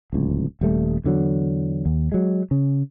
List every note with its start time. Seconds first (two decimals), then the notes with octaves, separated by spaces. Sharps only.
0.13 D1 C#2
0.61 D#1 G3 A3
1.04 E2 D3 F#3
1.86 D#2
2.12 F#3 G#3
2.51 C#3